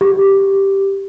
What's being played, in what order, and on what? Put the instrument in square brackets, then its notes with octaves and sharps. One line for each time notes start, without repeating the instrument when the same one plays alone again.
[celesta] G4